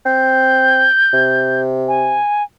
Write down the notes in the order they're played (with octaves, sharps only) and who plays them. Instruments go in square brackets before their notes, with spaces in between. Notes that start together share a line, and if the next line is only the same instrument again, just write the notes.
[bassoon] C4 [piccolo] G6
[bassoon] C3
[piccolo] G#5